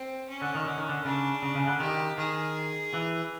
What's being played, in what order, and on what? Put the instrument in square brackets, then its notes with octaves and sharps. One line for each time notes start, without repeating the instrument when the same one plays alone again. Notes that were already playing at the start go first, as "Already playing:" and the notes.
Already playing: [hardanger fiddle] C4
C#4
[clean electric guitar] D3
D#3
D3
D#3
D3
[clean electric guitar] C#3 [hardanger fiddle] D4
[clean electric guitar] C#3
C#3
D3
[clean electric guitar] D#3 [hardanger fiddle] G4
[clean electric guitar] D#3 [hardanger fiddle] G#4
[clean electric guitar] E3